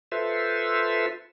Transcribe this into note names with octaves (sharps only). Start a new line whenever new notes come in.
F4 A4 B4 C5 E5